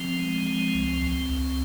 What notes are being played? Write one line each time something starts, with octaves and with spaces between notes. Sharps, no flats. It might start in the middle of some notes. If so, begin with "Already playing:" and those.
Already playing: F3 C4
G#3
F3
C#2
C#2
C#2